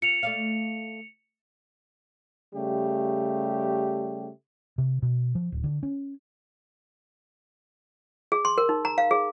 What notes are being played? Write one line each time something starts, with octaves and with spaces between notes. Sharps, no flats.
F4 C#7 F7
A3 D5 F5
C#3 G3 A3 G4
C3
B2
F3
D1
D3
C#4
G#4
C6
A#4
D#4
A#5
F5
G#4